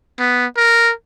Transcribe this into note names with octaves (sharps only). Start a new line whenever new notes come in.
B3
A#4